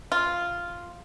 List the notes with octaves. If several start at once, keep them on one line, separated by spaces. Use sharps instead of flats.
F4